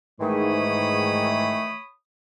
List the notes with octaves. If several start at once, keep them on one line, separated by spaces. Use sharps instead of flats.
G#2 D#3 E3 A3 C#5 B5 D#6